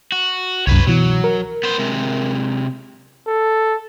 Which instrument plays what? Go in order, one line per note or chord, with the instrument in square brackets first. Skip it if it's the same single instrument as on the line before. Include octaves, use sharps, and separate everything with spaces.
[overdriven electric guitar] F#4
[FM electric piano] C2 F#2 [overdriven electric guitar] B4 C#5
[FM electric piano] B2 E3 [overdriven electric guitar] F#3
[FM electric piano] A#4
[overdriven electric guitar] B3 C5
C3 G#3
[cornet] A4